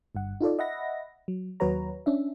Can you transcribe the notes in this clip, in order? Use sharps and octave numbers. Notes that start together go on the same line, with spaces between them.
G1 G2 F#5
D#4 F4 A4 D5
D#5 E5 F#5 B5 A#6
F#3
D#2 F#3 F#4 B4 C#5 A#5
C#4 D4 E5